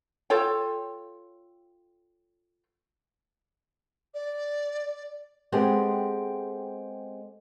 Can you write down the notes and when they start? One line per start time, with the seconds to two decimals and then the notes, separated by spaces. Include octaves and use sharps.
0.30 F4 A4 C#5 G5
4.14 D5
5.52 G#3 B3 C4 G4 A4